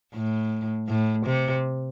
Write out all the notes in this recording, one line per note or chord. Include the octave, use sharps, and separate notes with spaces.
A2
A2
C3